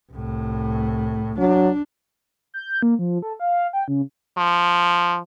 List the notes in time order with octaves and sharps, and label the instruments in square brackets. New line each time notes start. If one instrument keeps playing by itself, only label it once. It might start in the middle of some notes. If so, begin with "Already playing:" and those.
[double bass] C2 A2
[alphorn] F#3 [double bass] D4
[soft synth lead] G6
A#3
F3
A4
F5
G5
C#3
[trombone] F3